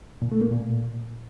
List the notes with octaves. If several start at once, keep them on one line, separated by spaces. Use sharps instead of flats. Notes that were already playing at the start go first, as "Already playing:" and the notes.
A#2
A3
A#3
A#2